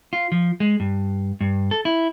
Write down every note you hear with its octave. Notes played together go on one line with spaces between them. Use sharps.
F4
F3
G#3
G2
G2
A4
E4